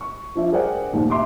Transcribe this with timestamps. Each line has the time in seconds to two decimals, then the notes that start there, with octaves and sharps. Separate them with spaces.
0.01 C#6
0.35 F3 D4 E5
0.52 G#4 A#4 C5 D5 F#5 G5
0.92 A#1 D#2 G#2
1.10 E5 C6 D6